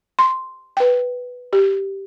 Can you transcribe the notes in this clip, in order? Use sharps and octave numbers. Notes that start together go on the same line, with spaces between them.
C6
B4 G5
G4